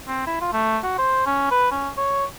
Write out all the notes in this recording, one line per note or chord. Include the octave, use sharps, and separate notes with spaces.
C4
E4
F4
A3
F#4
C5
C#4
B4
C#4
C#5